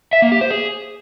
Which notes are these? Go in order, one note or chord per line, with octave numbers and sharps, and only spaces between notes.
E5
A#3
G4
C5
G#4